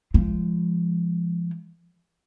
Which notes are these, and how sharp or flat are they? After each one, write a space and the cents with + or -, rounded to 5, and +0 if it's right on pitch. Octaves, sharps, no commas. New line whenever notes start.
F3 -25 G#3 -10